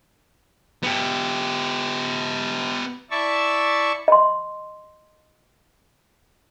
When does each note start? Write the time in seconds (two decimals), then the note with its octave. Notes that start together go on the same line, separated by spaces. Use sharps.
0.83 B3 G4
3.11 E4 D5 E5 A5 C#6 E6
4.08 D#5 C6